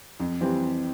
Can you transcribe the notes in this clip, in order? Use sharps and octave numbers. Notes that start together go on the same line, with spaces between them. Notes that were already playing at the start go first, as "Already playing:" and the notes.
F2
E3 G3 C4 G4